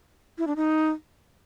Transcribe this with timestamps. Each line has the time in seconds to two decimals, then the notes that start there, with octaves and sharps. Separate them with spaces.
0.38 E4
0.47 D4
0.56 D#4